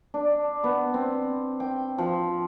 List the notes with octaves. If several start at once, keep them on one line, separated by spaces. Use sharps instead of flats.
D4
B3
C4
G5
F3